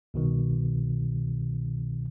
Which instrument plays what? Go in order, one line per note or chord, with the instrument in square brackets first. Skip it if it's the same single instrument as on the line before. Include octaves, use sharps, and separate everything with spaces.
[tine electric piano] C2 B2 D#3